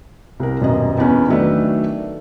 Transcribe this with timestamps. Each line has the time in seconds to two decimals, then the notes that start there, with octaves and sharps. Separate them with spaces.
0.40 C2 A#4
0.61 D#1 F#2 B2 D#5
0.99 E2 B3 C#4
1.28 D#3 F#3 A3 D4 B4